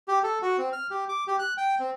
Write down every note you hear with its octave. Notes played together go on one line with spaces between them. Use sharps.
G4
A4
F#4
C4
F6
G4
D6
G4
F#6
G5
C4